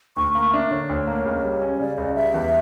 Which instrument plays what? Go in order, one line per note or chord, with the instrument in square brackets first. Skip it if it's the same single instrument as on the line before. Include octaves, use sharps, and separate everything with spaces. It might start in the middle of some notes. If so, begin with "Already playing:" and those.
[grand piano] D2 [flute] C#6
[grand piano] A#3 [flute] C#6
[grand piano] D4 [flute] E5
[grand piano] D3 [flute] C#5
[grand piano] D2
A#3
C#2
G3
C#4
[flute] C#5
[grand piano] C#3 [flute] D5
[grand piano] C#2 [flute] D5
[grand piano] G3 [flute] E5
[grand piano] E2